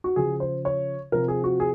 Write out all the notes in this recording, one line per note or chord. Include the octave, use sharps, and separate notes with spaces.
F#4
C#3 F3 G#4
C5
C#5
C3 F3 A#4
G#4
F#4
G#4